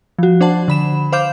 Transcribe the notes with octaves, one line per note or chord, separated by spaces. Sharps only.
F3 F#4
D4 C5 F#5 A5
D3 B5 E7
C5 F5 D6 G6 E7